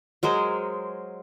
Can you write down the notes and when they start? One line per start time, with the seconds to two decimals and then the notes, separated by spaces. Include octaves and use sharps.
0.23 F#3 G#3 A#4 C5